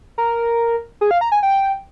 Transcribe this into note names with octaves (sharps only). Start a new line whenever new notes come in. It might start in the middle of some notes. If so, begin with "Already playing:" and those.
A#4
G#4
F5
A#5
G#5
G5